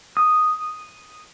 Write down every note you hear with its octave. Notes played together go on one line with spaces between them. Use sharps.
D#6